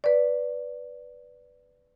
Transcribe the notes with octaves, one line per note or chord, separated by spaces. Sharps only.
B4 D5